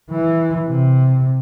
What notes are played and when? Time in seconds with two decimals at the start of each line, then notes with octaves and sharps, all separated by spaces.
0.11 E3
0.67 C3